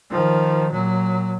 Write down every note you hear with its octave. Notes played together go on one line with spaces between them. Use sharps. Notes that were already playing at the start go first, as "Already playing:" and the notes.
D#3 F3
A#2 F#3